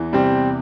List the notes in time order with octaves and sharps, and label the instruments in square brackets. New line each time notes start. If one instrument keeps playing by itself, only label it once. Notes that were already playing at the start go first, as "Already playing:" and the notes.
Already playing: [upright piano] E2 E3
[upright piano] C3 [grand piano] G3 C4